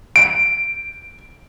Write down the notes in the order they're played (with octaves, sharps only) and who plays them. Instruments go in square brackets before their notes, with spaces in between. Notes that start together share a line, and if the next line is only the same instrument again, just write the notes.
[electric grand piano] D7